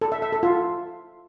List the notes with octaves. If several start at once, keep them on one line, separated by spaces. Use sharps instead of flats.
A4
E5
E5
A4
F4